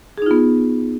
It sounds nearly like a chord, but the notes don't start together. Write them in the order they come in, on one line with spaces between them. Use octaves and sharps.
G#4 D#4 F4 B3